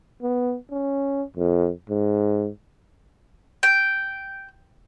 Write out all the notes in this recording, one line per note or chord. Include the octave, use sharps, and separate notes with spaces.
B3
C#4
F2
G#2
G5